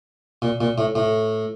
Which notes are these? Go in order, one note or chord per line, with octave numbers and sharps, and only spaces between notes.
A#2
A#2
A2
A2